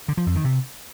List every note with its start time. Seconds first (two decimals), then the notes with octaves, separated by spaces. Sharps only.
0.08 D3
0.17 F3
0.26 F2
0.35 D#3
0.44 C3